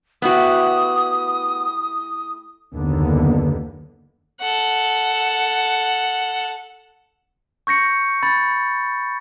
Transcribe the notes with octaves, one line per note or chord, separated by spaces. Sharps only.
A3 B3 E4 F#4 G4 D#6
F#1 D#2 D3 B3
A4 F#5
C#6 G6 A#6 C#7
B5 A6